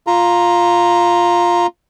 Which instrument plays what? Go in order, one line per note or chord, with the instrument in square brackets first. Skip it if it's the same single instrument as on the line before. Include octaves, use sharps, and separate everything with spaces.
[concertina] F4 A#5